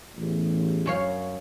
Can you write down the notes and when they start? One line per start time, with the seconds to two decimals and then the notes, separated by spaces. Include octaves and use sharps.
0.17 A1 E2
0.86 F#2 C#5 F5